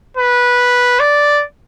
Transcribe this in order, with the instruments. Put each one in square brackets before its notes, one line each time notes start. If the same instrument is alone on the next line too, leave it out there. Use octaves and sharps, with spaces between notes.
[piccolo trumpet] B4
D5